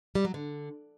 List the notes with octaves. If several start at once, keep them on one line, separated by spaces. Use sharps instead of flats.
G3
F#3
D3